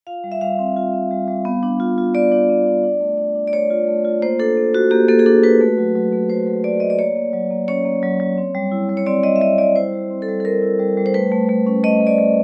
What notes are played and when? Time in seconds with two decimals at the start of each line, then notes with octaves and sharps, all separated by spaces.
0.07 F4 F5
0.24 G3
0.32 E5
0.41 G3 F5
0.59 C4
0.76 F4
0.94 C4
1.11 G3
1.28 G3
1.45 B3
1.63 D4
1.80 F4
1.98 F4
2.15 B3 D5
2.32 D4
2.49 B3
2.66 D4
2.83 D4
3.01 A3
3.18 D4
3.36 D4
3.48 D5
3.53 A3 C#5
3.70 F4
3.88 A3
4.05 F4
4.22 A#3 C5
4.39 D4 A4
4.57 A#3
4.74 F#4
4.91 A#3 G4
5.08 A#3 A4
5.19 G#4
5.26 D4 A4
5.43 F#4 B4
5.61 A3
5.78 F#3
5.95 F#3
6.12 A3
6.30 F#3 C5
6.47 F#3
6.64 A3 D5
6.80 A3 D#5
6.90 D5
6.99 A#3 C#5
7.16 A#3
7.33 F#3
7.51 A#3
7.68 C#4 C#5
7.85 A#3
8.03 F#3
8.20 F#3
8.38 C4
8.55 G3
8.72 E4
8.89 G3
8.97 C#5
9.07 C4 D5
9.24 G3 D#5
9.36 E5
9.41 C4 D#5
9.58 G3 D5
9.76 E4 C5
9.93 G3
10.11 C4
10.22 A4
10.28 G3
10.40 A4
10.45 G3 A#4
10.62 E4
10.80 G3
10.97 G3
11.06 C5
11.14 A3 B4
11.32 A3
11.49 A3
11.67 C#4
11.84 A3 D#5
12.01 A3
12.07 D5
12.18 A3